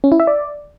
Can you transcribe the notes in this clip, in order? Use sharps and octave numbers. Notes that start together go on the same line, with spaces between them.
C#4
E4
E5
D5